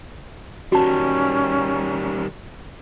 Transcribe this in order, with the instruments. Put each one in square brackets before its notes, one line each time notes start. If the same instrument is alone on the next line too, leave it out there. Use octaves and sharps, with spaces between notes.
[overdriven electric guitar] D#3 G3 [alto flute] C#4 [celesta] F#4 A5